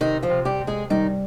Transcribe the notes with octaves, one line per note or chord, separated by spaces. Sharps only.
C3 D#3 D#4
F3 F4
C3
G3 G4
C4
G#3 G#4
D#3 G3 D#4